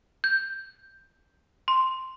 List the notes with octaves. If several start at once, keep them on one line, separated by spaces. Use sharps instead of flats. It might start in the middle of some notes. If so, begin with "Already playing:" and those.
G6
C6